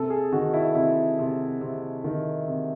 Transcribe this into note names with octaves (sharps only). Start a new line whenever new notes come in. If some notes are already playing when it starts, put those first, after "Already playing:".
Already playing: C3 A4
G#4
D#3 F#4
E4
C3 E4
C3
C3
D#3
C3